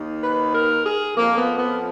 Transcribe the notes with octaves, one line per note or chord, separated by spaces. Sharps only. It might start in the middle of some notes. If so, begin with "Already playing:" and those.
Already playing: D#2 D#3
B4
A#4
G#4
F2 F3 A#3
B3
B3